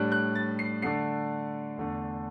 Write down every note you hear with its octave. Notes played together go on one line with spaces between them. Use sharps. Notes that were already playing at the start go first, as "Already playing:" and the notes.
Already playing: A2 G3 D4 F#6
F#6
A6
C7
D3 A3 D4 C7
E2 D3 A3